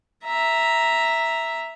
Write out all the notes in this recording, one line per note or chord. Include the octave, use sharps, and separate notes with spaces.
E5 A#5